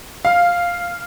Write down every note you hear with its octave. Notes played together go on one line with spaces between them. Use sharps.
F5